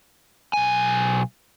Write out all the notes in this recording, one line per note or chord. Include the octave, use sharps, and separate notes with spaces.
B1 G#5